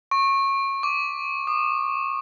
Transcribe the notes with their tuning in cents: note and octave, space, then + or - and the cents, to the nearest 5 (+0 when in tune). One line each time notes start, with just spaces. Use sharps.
C#6 -20
D6 -15
D#6 -35